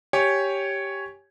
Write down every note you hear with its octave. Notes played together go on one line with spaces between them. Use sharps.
G4 C#5 G#5